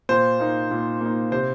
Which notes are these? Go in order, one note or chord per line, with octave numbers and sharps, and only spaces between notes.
A#2 C5
A#3 D#4
A#2
A#3 D#4
C3 C5